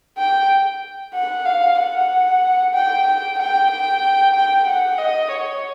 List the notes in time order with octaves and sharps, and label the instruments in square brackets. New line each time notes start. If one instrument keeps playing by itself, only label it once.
[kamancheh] G5
F#5
F5
F#5
G5
G5
G5
G5
G5
F#5
D#5
C#5